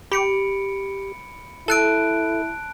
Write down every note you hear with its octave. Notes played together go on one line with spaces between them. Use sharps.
G4 B5 C#7 D7
E4 A4 A5 F#6 D7